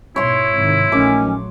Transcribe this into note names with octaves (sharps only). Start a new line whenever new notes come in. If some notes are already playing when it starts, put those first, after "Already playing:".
G#2 B2 E4 C#5 C6
G#2 C3 D#3
A#1 D#3 F#3 A3 C#4 D6